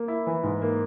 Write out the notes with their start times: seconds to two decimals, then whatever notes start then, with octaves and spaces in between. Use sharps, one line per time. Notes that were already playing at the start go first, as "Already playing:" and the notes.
Already playing: A#3
0.08 E4
0.27 E3
0.43 G#2
0.62 A#3